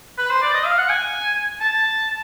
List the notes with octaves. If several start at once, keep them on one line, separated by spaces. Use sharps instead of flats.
B4
C5
D5
D#5
F5
F#5
G#5
A5